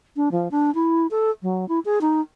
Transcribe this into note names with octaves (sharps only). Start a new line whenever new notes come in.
D4
F3
D4
E4
A4
F#3
E4
G#4
D#4